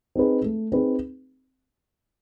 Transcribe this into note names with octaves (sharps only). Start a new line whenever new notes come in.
C4 D#4 G#4 B4
A3
C4 D#4 G#4 B4